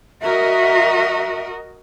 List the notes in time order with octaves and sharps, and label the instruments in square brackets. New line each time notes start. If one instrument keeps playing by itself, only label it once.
[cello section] F#4 A#4 D#5 [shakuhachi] E5